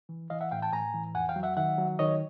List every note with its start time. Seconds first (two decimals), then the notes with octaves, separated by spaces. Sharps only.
0.09 E3
0.30 E3 D#5 F5
0.41 E5 F#5
0.51 A2 F5 G5
0.62 G5 A5
0.72 A2 G#5 A#5
0.94 E3
1.14 F2 F#5 G#5
1.29 F5 G5
1.36 F#3
1.43 E5 F#5
1.57 D#3 E5 F#5
1.78 F#3
1.99 D#3 C#5 D#5